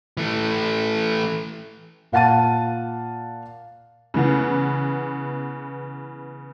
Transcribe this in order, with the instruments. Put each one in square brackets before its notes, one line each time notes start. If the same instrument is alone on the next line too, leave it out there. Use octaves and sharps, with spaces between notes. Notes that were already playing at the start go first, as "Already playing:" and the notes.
[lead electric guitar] E3 A3
[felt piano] A#2 F5 F#5 A5 A6 D#7
[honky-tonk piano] C#3 E3 B3